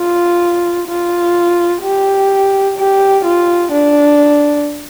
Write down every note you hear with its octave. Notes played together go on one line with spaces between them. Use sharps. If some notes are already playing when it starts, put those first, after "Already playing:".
Already playing: F4
F4
G4
G4
F4
D4